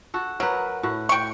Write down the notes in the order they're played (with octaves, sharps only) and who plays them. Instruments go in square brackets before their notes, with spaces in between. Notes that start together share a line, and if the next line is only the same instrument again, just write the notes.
[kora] F#4 A4
[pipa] F#3 [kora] A#4 B4
[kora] A2 F#4
[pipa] G5 C#6